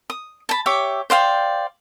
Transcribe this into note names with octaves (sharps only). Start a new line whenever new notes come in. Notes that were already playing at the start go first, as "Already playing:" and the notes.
D#6
A5 B5
G4 C#5 E5 D6
C5 D5 F5 G5